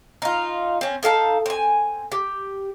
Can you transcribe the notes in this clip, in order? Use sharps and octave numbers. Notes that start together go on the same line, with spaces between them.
D#4 F4
C4 C#4
D#4 A4 F5 A5
C4 G#5
G4